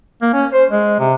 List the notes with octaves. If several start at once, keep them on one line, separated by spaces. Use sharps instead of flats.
A#3
C#4
C5
G#3
C3